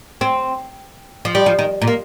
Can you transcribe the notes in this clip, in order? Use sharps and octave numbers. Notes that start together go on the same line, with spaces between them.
C4
F3
G3
F3
D#3
A#2
A#3